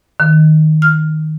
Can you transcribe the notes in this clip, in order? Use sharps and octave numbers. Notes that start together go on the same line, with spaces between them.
D#3
F6